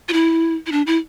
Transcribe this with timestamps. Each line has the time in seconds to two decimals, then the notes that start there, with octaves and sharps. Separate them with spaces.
0.09 F4
0.13 E4
0.66 E4
0.72 D4
0.87 E4